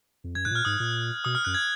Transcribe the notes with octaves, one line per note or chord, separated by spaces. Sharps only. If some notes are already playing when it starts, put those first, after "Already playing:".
F2
F#2 G#6
G#2 F#6
A#2 F6
G#2 D#6
A#2
B2 D#6
F6
F#2 F#6
G#6